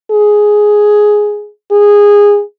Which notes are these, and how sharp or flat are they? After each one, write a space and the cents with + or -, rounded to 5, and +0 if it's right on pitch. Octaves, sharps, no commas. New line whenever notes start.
G#4 +5
G#4 -15